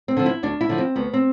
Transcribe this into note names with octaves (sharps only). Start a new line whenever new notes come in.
C4
D3 F3
E4
D2 D4
E4
D3 F3
C4
D2 B3
C4